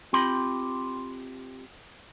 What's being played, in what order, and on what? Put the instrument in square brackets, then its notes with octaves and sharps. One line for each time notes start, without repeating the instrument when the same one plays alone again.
[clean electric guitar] C4 F4 G4 B5 C6